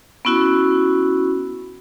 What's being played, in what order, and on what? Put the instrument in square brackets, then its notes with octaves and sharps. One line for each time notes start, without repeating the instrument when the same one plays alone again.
[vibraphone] B3 C#4 E4 F#4